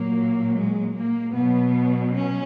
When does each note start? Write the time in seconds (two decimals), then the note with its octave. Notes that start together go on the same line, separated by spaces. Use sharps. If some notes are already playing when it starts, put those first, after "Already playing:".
Already playing: A#2 F#3 A#3
0.56 G#3
0.96 A#3
1.33 B2 F#3 B3
2.12 C#4